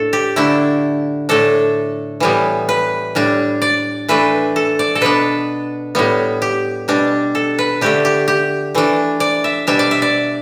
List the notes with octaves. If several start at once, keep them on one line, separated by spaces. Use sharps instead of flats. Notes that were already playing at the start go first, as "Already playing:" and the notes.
Already playing: A2 A3 D4 A4
G4
D3 A3 D4 E4
A2 A3 D4 A4
A2 E3 G3 B3
B4
A2 G3 D4
D5
E3 A3 D4 B4
A4
D5
A4
B2 B3 D4 B4
A2 G3 B3
G4
B2 G3 D4
A4
B4
D3 A3 D4 G4
G4
G4
E3 A3 D4
D5
E5
B2 G3 D4 E5
D5
E5
D5